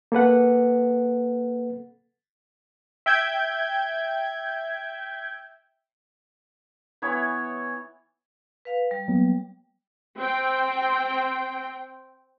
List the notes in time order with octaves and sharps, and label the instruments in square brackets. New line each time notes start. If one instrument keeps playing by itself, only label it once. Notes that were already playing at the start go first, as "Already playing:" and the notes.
[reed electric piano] A#3 A4 B4 F#5
[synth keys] E5 G5 G6 G#6
[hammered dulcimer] E3 B3 E4 C#5
[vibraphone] B4 F5
G3
[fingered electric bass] F#3 A#3 B3
[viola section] C4 G5